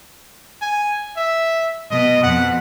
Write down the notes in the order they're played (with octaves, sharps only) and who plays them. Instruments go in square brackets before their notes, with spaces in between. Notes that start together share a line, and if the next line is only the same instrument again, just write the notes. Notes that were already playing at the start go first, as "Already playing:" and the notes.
[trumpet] G#5
E5
[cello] B2 [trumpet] D#5
[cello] F2 B2 [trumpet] F#5